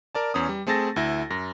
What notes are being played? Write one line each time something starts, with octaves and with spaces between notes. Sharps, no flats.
A#4 D5 A5
E2 C#4 D#6
G3
A3 C4 G#4 A5 A6 A#6
D2 E4 A#6
F#2 A#6